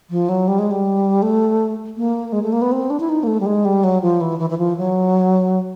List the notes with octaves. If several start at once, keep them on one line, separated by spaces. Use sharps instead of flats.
F3
F#3
G3
G#3
G3
A3
A#3
G#3
A3
A#3
B3
C4
D4
E4
D#4
A#3
A3
G3
G#3
G3
F#3
F3
E3
E3
E3
F3
F#3